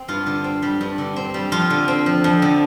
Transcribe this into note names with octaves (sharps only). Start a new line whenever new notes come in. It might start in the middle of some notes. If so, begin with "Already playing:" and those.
Already playing: C4
G2 F4
D3
C4
G3
G2
D3
C4
G3
F2 F4
D3
C4
F3
F2
D3